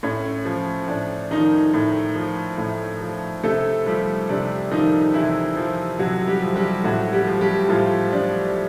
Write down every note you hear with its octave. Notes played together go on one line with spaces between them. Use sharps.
A2 C#4
F3
A2 D4
D#3 F3 D#4
A2
F3
A2
F3
C3 A3 A4
F3 G3 G4
C3 D4
D#3 F3 D#4
C3 E3 E4
F3
C3 F#3 F#4
G3 G4
F3
G3 G4
A2 F#3 F#4
G3 G4
F3
G3 G4
A2 F3 F4
F3 D4